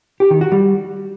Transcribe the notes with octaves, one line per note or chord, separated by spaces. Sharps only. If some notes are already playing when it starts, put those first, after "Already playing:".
G4
D#3
F#4
G3